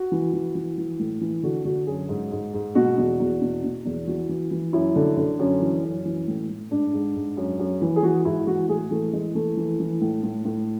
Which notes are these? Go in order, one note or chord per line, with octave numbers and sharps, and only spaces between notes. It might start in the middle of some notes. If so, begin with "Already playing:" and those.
Already playing: F#4
E3
E3
E3
E3
A2
E3
D3 F#4
D3 F#4
F#2 G#4
G#2
G#2
G#2
B2 F#4
E2
E2
B2
B2
E2
E3 F#4
E3
E3
F#2 E4
D3
D3
F#2 C#4
E3
F#2
E3
A2
A2
G#2 D4
G#2
G#2
F#2
F#2
E3
G#4
E3 F#4
G#2 E4
E3 F#4
A2 G#4
E3 A3
E3 G#3
E3 A3
E3
E3
A2
A2
A2